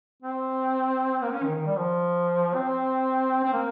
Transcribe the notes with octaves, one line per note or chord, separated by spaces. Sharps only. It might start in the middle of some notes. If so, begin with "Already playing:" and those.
C4
A#3
C#4
D#3
D#3
G3
F3
C4
C4
A#3